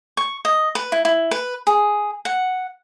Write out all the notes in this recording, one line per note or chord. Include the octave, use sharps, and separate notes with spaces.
C#6
D#5
B4
E4
E4
B4
G#4
F#5